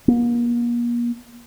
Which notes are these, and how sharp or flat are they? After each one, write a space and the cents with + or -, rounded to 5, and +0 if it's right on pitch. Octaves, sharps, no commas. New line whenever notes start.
A#3 +40